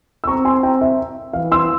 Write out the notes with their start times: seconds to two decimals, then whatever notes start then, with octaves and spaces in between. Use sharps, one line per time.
0.24 E6
0.27 C4 A#5 C#6
0.45 G#5 C6
0.63 G5 A#5
0.81 E5
1.33 E3 F5
1.52 C6 E6